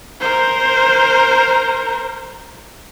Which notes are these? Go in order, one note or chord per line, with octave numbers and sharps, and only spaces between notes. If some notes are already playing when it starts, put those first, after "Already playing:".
A#4 C5